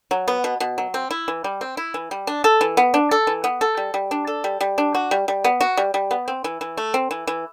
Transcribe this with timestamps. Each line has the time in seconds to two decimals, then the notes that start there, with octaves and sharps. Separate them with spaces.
0.11 F#3
0.28 B3
0.44 B2
0.60 B2
0.78 F#3
0.94 C4
1.11 E4
1.28 E3
1.44 G3
1.61 C4
1.77 E4
1.94 E3
2.11 G3
2.27 D4
2.44 A4
2.61 E3
2.77 B3
2.94 D4
3.11 A4
3.27 E3
3.44 B3
3.61 A4
3.77 G3
3.94 G3
4.11 D4
4.27 A4
4.44 G3
4.61 G3
4.78 D4
4.95 F#4
5.11 G3
5.28 G3
5.44 B3
5.61 F#4
5.77 G3
5.94 G3
6.11 B3
6.28 C4
6.44 E3
6.61 E3
6.77 A3
6.94 C4
7.11 E3
7.27 E3